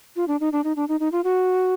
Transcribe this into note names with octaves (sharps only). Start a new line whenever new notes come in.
F4
D4
D#4
D4
D#4
D4
D#4
D#4
F4
F#4